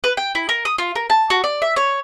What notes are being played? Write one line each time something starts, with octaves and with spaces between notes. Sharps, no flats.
B4
G5
E4
A#4
D#6
F4
A#4
A5
F#4
D5
E5
C#5